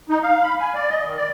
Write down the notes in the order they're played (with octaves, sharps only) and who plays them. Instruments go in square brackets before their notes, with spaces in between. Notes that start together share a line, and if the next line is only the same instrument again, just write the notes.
[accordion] D#4
F5
B5
G#5
D5
D#5
D#3
D5